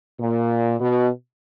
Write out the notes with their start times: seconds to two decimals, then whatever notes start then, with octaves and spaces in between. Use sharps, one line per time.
0.19 A#2
0.80 B2